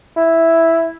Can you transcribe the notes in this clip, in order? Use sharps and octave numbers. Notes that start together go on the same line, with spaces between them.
E4